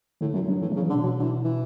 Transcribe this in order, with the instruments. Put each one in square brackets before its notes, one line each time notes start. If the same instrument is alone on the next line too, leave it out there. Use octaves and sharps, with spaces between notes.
[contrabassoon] A2 [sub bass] D3
[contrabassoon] F#2 [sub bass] F#3
[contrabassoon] G2 [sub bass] F#3
[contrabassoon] A2 [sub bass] E3
[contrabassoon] C#3 [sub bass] F#3
[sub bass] E3
[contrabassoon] D3
[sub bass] B2
[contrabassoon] F#3
D3
E3
E3